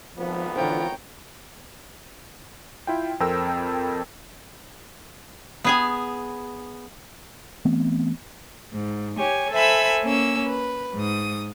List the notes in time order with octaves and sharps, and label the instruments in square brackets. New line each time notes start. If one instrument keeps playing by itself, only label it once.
[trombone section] G#1 F2 B3 [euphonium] F3
[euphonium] D3 [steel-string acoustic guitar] E3 F4 C5 [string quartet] C#5 G5 A#5
[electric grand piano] E4 F4 G5
F2 C4 A4 A#4 G5 E6
[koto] B3 G#4 G#5
[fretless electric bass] E3 A3 B3 C4
[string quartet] G#2
G4 C#5 G#5
A4 C5 E5 G#5 B5 E6
A#3 C#4 E6
B4
G#2 D#6